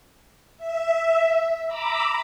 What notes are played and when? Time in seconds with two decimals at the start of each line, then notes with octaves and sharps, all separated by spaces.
0.58 E5
1.68 A#5 B5 D6 E6